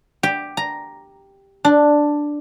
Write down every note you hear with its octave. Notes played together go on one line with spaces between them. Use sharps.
G4
A#5
D4